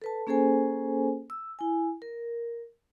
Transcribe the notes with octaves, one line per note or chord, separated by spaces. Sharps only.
A4 B4 A5
A#3 C#4 G#4 A4 C5 G#5
E6
E4 G#5
A#4